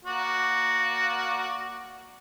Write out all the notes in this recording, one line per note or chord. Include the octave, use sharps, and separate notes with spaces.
A#3 F#4 D5